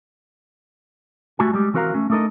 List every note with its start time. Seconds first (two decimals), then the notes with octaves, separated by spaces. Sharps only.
1.39 G3 A3 F#4 G#5
1.54 G3 G#3 G4
1.74 E3 C4 F#4 A#4 F5 A#5
1.94 A3 C#4
2.10 A3 D4 D#4 A4 A#4 D#5